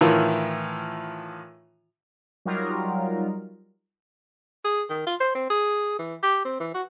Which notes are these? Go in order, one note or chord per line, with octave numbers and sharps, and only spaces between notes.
A2 D#3 E3 F4
F#3 G3 D#4 F4 A#4
G#4
D#3
F4
C5
C4
G#4
E3
G4
C4
E3
F#4